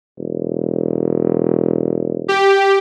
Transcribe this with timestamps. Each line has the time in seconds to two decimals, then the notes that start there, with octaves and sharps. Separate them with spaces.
0.18 E1
2.28 G4